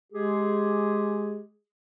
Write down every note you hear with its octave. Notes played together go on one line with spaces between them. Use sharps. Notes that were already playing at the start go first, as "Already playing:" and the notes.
G#3 G4 G#4